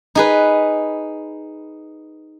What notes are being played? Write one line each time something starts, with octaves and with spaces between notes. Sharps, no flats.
D#4 G#4 B4